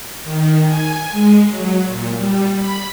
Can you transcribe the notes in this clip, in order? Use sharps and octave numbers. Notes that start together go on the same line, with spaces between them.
D#3
G#5
G#3
F#3
A#2
G3
B5